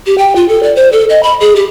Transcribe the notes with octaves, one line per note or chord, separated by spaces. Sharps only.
G4
G5
F4
A4
D5
C5
A4
D#5
B5
G#4
G4